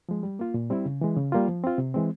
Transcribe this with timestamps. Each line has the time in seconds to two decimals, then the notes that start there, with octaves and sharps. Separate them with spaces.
0.09 F3 G#3
0.23 G3
0.39 A#3 F4
0.54 A#2
0.70 G3 C4 E4
0.86 C#3
1.01 E3 G#3
1.16 C#3
1.32 G3 A#3 F4
1.48 F3
1.64 C4 F4
1.78 C3
1.94 E3 G#3 C4